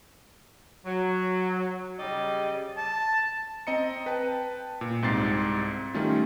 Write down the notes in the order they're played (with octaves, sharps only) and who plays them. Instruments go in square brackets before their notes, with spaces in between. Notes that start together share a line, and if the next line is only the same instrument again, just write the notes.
[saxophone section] F#3
C#3 G3 G4 D5 D#5
[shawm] A5
[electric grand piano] C4 D#5 A#5 C#7
B4 G5 A5
A#2
C2 G#2 C4 A6 C7
D#3 G3 A3 C#4 F4